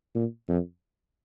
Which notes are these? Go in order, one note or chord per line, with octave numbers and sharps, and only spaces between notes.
A#2
F2